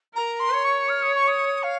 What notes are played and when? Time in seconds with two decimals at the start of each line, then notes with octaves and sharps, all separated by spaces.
0.15 A#4 A#5
0.39 C6
0.51 C#5
0.64 C#6
0.89 F6
1.02 D#6
1.15 C#6
1.27 D#6
1.63 F5